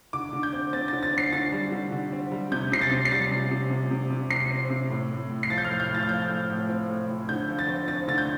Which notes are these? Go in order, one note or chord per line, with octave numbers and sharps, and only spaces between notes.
D3 D6
D3
G6
C4
C4 A6
D3 A6
A6
C4 C7
D3 A6
G3
D3
D3
C4
G3
C3 G6
C3 C7
A6
C3
C7
G3 A6
C3
C3
C3
C3
C3
C3 C7
C4
C3
A2
A2
A2
C7
F3 A6
G6
F6
A2
G6
A2
A6
F6
F3 G6
A2
A2
C4
A2
A2
D3 G6
F3
A6
C4
C4 A6
D3 A6
G6